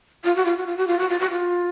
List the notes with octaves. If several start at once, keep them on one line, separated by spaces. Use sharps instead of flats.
F4
F#4
F4
F#4
F4
F#4
F4
F#4
F4
F#4
F4